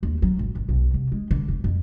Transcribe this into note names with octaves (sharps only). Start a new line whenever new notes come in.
D#2
F#3
G#1
G#1
B1
C2
G#3
D3
E1
F2